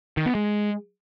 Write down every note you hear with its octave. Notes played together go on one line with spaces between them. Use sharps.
D#3
B3
G#3